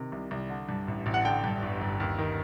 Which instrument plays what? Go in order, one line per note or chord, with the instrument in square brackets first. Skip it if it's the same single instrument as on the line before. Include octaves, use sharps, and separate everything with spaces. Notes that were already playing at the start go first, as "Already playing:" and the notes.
Already playing: [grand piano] C3 D#3
C2
C2
D3
G2
A1
A1
F#5
D3 G5
G2
G1
G1
D#2
D#3